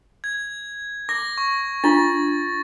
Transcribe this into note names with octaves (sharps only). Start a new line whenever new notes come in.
G#6
D6 A#6
C#6
D4 F4 A6